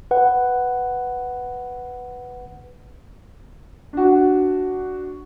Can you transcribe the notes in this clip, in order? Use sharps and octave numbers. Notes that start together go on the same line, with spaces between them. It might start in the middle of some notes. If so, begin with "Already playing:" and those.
B4 F#5
D4 F#4